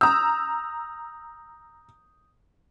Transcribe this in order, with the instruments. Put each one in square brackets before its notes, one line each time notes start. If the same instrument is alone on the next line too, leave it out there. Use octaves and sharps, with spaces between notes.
[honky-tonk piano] A#5 E6 [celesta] D#6 G6